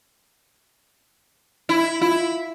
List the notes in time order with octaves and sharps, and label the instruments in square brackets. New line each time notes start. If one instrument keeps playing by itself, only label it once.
[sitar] E4
[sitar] E4 [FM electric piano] F4